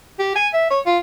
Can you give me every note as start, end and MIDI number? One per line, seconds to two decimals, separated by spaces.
0.19 0.34 67
0.35 0.48 80
0.54 0.69 76
0.71 0.80 73
0.86 0.98 65